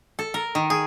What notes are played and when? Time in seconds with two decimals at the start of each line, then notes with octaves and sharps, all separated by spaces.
0.19 A4
0.34 A#4
0.55 D#3
0.70 G#4